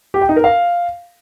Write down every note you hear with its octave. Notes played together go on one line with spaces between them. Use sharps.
G4
G5
D#4
A#4
F5